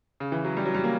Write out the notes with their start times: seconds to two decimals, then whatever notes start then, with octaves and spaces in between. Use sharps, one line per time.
0.20 C#3
0.32 E3
0.44 F#3
0.57 G3
0.66 F#3
0.74 G3
0.84 A#3